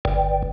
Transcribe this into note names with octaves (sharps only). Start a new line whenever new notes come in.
G1